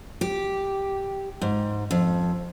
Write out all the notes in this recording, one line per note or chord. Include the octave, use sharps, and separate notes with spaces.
G4
G#2
F2